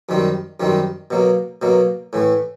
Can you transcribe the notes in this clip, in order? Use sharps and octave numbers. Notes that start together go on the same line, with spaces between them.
F#2 D#3 G3 C4
F#2 D#3 G3 C4
B2 F#3 A#3
B2 F#3 A#3
A2 E3 A3